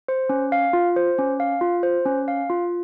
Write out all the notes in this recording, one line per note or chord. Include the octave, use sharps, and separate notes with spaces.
C5
C#4
F5
F4
C5
C#4
F5
F4
C5
C#4
F5
F4